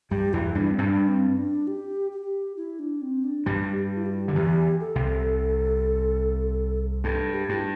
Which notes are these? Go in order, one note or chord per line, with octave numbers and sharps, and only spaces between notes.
G2 G3 G4
E2 E3 E4
G2 G3 D4
C4
G2 G3 D4
C4
D4
G4
G4
E4
D4
C4
D4
G2 G3 G4
G4
E4
G4
D3
E2 E3 G4
A4
C2 C3
G2 A4
G4
G2 E4